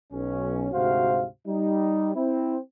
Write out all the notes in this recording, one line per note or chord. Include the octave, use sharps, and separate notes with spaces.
B1 C#4
D2 G#2 C3 F#4 C5 F5
G3 D#4
C4 E4